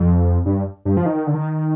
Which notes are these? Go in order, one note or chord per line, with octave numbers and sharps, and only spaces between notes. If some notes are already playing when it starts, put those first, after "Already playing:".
Already playing: F2
G2
G2
F3
D#3
D3
D#3